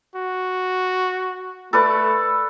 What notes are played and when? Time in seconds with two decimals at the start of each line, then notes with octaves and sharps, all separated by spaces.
0.16 F#4
1.73 A3 A4 B4 D5